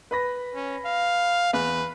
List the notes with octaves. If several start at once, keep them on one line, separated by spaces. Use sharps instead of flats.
B4 B5 A#6
C#4
F5
E2 B4